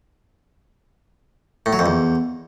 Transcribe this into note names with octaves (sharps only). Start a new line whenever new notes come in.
A2
F#3
F2
E2